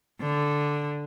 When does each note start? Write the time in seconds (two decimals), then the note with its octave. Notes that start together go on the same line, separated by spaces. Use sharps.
0.21 D3